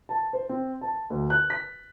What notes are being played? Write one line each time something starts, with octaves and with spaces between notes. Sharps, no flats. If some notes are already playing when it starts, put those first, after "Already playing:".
A5
C5
C4
A5
D2
F#6
B6